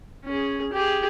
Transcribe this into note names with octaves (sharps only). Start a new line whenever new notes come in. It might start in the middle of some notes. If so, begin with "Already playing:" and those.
C#4 G#4
G4 G#4